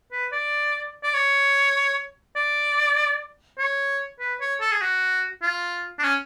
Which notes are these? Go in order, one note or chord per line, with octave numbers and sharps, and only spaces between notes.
B4
D5
D5
C#5
D5
C#5
B4
C#5
A4
G#4
F#4
F4
D4
C#4